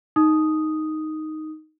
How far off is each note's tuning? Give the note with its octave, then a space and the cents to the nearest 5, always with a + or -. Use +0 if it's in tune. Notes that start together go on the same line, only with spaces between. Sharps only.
D#4 +0 D#6 +0